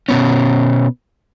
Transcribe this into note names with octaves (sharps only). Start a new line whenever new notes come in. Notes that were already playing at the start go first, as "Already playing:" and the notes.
B2 B3 C#4